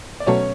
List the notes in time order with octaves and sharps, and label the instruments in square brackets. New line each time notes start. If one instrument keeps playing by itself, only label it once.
[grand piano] D5
[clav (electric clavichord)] B2 F#3 A3 [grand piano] C#4 C#5